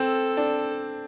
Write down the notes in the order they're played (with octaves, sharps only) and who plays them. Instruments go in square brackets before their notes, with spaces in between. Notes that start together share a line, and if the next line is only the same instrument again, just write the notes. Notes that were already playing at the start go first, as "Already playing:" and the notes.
Already playing: [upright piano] C4 [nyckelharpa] A4
[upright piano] D4